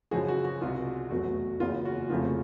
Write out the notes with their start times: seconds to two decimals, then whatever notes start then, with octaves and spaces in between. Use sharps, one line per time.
0.11 F#2 C#3 F3 G#3 F#4 G#4
0.28 F#4
0.45 F#4
0.61 C2 B2 G#3 F4
1.10 F1 E2 B2 F#3 A3 F#4
1.60 F#1 E2 C#3 F4
1.85 F#4
2.10 F1 F2 C#3 F3 A3 F4